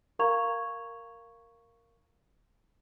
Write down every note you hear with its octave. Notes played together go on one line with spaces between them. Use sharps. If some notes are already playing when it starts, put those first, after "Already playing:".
A#4 F5 A#5 C#6 G#6 F7